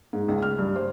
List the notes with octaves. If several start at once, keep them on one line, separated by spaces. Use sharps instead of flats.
G#2
C#2
F6
G2
C5